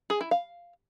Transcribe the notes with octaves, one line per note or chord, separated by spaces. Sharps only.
G#4
E4
F5